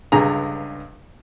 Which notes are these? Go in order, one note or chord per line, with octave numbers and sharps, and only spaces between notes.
C#2 G2 D3 G#4 A#5